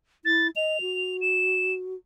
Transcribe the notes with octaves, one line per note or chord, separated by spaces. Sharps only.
E4 A6
D#5 F7
F#4
E7